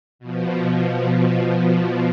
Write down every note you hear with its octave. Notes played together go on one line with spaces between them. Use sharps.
B2 F3